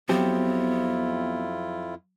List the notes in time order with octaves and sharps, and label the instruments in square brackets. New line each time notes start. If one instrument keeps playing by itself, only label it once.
[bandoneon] F2 E4 F4 [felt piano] F#3 [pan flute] B3 [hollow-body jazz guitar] C4 G4